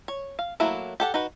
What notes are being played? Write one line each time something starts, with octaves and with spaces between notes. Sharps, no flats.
C#5
F5
F#3 A3 A#3 E4
G4 A4 F#5
D#4 F#4 B4